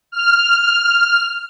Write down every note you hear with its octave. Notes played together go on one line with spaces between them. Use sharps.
F6